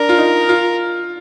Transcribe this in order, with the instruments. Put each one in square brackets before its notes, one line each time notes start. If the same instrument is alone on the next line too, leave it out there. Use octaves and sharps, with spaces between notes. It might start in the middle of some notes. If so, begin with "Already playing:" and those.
Already playing: [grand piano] D4 [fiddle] A#4
[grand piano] F4
D#4
F4